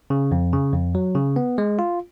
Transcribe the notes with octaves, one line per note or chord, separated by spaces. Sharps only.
C#3
F2
C#3
F2
F#3
C#3
B3
G#3
F4